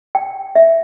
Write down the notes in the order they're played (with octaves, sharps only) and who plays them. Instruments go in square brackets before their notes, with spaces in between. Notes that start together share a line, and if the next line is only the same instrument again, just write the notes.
[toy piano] G5
E5